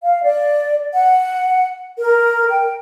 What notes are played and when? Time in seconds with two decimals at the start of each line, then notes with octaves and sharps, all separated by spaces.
0.02 F5
0.23 D5
0.92 F#5
1.97 A#4
2.49 G5